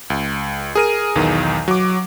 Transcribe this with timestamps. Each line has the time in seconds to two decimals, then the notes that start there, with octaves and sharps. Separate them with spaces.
0.10 C#2
0.75 G#4 A#4 D#7
1.15 B1 E2 D#3
1.68 F#3 D6